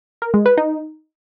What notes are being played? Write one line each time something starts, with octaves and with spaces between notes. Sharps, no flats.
A#4
G#3
B4
D#4